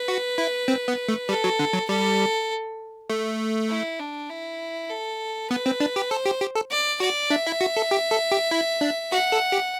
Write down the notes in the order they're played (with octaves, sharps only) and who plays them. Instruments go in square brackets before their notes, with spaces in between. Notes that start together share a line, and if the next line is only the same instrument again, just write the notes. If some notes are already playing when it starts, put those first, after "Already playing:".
Already playing: [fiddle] B4
[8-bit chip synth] F#4
E4
C4
B3
A3
[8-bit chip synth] G3 [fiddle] A4
[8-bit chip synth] F#3
D3
F#3
[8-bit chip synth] G3 [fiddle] A4
[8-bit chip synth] A3
[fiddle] E4
D4
E4
A4
[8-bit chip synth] B3 [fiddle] B4
[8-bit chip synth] C4
D4
G4
[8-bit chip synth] A4 [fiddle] C5
[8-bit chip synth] G4
G4
A4
[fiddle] D5
[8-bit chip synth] F#4 [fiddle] D5
[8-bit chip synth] D4 [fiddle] E5
[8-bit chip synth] E4
F#4
A4
G4
A4
G4
E4
D4
[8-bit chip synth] F#4 [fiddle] F#5
[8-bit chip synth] A4
G4